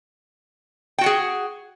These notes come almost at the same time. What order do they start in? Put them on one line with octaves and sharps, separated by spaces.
G5 F#4 F#5 G#4